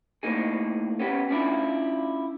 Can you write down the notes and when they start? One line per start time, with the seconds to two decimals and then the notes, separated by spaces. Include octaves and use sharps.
0.23 A2 A#3 D#4 G#4
1.00 B3 C#4 G4
1.30 C#4 D4 E4 F4